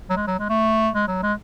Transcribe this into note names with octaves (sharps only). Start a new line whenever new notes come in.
F#3
G#3
F#3
G#3
A3
G#3
F#3
G#3